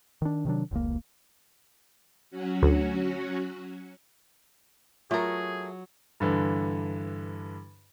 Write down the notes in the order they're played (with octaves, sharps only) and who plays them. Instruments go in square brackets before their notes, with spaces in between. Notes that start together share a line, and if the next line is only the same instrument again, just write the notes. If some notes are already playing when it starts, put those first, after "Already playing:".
[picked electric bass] D#3 D4
C3 D#3 F#3 D4
F1 C#2 A#3
[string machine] F#3 C#4 F#4
[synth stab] D2
[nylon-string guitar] F#3 [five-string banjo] A3 A#4 [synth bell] F4 [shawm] G#4
[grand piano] G2 D3 E3